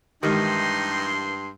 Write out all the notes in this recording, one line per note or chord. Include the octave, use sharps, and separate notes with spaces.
G2 D#3 E3 G#3 D#4 G4 C6